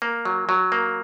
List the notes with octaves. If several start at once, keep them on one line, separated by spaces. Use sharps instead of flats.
A#3
F#3
F#3
A#3